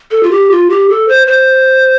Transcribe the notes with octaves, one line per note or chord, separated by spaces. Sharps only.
A4
F4
G4
F4
G4
A4
C5
C5